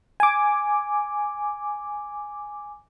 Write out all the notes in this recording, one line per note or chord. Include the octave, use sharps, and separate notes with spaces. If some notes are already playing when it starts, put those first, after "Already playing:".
G#5 D6